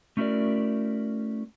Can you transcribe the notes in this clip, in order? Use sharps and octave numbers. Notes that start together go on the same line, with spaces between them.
A3 C#4 E4 F#4 A#4 D5